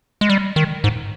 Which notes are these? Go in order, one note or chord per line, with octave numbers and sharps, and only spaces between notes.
G#3
G3
D#3
G#2